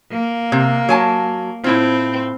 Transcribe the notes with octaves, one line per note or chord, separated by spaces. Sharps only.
A#3
C3
F#3 G#5 A5
A2 C4 E4 F4